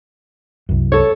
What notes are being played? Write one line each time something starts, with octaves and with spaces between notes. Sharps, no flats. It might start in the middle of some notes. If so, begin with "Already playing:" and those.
C2 F#2
A4 C#5